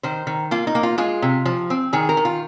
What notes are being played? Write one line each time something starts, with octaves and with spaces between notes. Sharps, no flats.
D#3 C5
D#3
A#3 F4
D#4
A#3
F4
G#3 F4
C3
F3
C4
D#3 G#4
A#4
D#3
F4